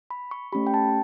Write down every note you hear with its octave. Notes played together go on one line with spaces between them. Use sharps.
B5
C#6
A3 C#4 G4 B5
G5
A5